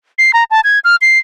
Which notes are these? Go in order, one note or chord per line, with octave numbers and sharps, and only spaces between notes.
C7
A#5
A5
G#6
F6
C7